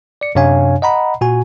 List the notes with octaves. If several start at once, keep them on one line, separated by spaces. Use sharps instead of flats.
D5 C#7
F#2 C3 D4 C#5 F5 G#5
D#5 F#5 A#5 B5
A#2 F#4 G#5